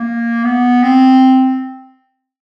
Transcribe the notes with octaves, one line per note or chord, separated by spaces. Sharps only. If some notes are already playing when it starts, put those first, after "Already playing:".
Already playing: A#3
B3
C4